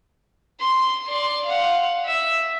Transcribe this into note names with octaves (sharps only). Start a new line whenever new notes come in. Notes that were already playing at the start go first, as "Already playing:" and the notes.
C6
D5 C6
F5 F#5
E5